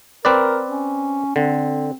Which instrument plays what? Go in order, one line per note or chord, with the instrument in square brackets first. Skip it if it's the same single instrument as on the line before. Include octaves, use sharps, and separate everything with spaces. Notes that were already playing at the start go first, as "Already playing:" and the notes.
[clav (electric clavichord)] C4 B4 D5 [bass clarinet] A#4
[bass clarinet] C#4
[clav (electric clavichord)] D3 [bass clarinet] C4